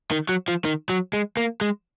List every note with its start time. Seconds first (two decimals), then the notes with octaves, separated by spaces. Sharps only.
0.11 D#3
0.29 F#3
0.48 F3
0.65 D#3
0.89 F#3
1.13 G#3
1.37 A#3
1.61 G#3